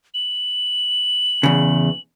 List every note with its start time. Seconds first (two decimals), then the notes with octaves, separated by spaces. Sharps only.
0.14 F#7
1.43 E2 C#3